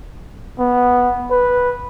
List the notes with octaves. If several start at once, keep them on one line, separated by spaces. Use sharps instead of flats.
B3
B4